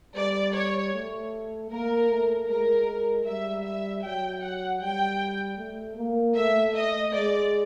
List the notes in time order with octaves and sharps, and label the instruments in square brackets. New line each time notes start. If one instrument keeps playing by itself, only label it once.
[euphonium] G3 [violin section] D5
[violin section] C#5
[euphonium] A3
[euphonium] A#3 [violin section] A#4
[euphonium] A3
[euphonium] G#3 [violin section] A#4
[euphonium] G3 [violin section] E5
[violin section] E5
[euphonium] F#3 [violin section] G5
[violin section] F#5
[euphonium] G3 [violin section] G5
[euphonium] A3
A#3
[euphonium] A3 [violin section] E5
[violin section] D#5
[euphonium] G#3 [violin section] D5